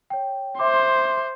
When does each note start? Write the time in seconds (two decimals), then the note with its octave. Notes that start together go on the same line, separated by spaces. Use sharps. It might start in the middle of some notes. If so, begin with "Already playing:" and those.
0.10 C#5 G5
0.59 C5 E5 C6 D6